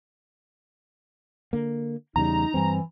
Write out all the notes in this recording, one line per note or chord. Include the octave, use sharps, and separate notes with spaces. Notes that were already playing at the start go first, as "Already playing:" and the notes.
D3 A#3
E2 C#3 G3 D#4 A#5
G2 E3 G3 C4